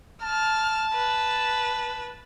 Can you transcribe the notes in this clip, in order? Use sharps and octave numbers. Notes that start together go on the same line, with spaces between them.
A5 F6
B4